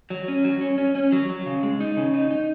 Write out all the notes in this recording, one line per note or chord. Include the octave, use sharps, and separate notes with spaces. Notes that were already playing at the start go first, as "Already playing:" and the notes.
F#3
C#4
F#3
C#4
C#4
C#4
F#3
F#3
C#3
G#3
D#4
C#3
D#4
D#4